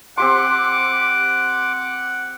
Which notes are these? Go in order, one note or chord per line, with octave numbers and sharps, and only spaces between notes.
C4 G4 F#5 C6 D6